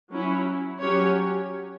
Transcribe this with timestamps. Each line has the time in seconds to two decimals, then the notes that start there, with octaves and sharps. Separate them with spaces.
0.10 F#3 C#4 E4
0.80 F#3 C#4 G4 C#5